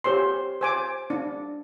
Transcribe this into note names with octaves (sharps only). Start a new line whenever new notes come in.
G4 C5 C#5 C6
C5 G#5 D6
D4